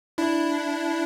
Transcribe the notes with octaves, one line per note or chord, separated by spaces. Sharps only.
D4 E4